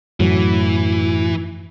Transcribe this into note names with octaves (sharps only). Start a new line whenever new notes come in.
F#2 A2 E3 F#3